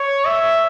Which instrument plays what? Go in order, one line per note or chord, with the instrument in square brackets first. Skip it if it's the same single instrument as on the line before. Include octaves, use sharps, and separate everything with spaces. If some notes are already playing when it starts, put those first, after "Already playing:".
Already playing: [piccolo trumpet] C#5
E5